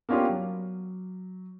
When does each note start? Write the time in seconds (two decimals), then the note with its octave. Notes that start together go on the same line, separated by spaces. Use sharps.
0.09 A#3 B3 C#4 D4 F4 G4
0.29 F#3